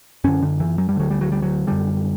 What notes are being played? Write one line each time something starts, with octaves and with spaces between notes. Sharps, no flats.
F#2 D3 C#4
D3
E3
F#3
G3
D2 D3 F#3
G3
F#3
G3
F#3
F#2 D3 G3